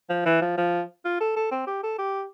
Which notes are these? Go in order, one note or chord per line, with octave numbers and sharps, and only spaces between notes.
F3
E3
F3
F3
F4
A4
A4
C4
G4
A4
G4